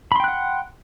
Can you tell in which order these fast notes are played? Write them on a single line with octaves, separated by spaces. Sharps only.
B5 C6 G5 F#6 F#5